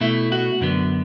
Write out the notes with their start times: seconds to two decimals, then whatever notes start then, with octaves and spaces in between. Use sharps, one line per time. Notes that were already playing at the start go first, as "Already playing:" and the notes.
0.01 B2 A3 E4
0.32 F#4
0.61 F#2 D3 B3